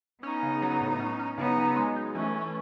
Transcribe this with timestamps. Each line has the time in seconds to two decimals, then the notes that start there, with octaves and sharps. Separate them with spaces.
0.23 B3 C#4 D#4
0.43 C#3
0.62 F#3
0.81 A2
1.00 C#4
1.19 C#4
1.38 C#3 B3 D#4
1.57 F#3
1.76 G#3
1.96 D#4
2.15 E3 A3 C#4
2.34 E3